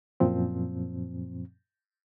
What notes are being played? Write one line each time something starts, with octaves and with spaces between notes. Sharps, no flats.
F#2 A#2 F3 C4